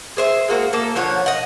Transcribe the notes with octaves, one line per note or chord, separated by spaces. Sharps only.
G#4 C5 E5
G#3 A#3 F#4
A#3 A4
D3 F3 C#5 F#5
D#5 F#5